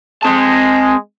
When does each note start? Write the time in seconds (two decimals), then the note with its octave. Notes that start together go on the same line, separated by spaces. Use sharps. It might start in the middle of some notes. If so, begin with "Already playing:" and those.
0.23 G#3 C4 A5